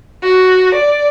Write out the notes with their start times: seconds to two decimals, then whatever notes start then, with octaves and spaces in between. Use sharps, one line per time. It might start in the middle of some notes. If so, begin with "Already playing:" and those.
0.23 F#4
0.75 D5